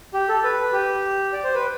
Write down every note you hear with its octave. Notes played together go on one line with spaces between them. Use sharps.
G4
A4
B4
G4
D5
C5
B4